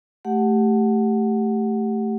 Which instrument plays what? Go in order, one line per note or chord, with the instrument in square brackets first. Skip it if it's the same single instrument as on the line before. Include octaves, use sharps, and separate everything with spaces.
[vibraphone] A3 G4 F#5